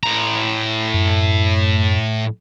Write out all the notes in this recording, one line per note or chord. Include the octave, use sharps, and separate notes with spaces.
A2 A#5
F#2